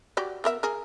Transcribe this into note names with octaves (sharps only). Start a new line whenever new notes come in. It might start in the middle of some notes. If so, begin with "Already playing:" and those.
F#4 G4 D5
B3 A#4 E5
G#4 A#4